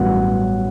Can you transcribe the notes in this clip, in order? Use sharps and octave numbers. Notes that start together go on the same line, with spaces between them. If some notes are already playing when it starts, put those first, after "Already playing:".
Already playing: A1 G2 F#3 B3 F#5